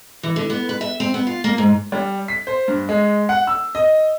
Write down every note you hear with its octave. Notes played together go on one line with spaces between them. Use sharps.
E3
D3
B3
B4
E5
C4
B3
F4
A#3
G#2
G3
B6
C5
G2
G#3
F#5
E6
D#5